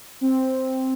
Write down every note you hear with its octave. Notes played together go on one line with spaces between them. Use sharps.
C4